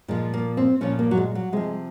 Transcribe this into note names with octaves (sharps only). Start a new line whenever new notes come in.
A#2 F3 G#3
A#3
C4
A#2 F3 C#4
A#3
F#3
G#3
F#3
C3 F3 G#3